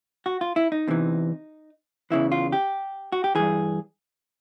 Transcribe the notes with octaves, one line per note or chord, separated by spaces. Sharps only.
F#4
F4
E4
D#4
E2 C3 E3
E2 C#3 E3 E4
F4
G4
F#4
G4
G2 E3 G#4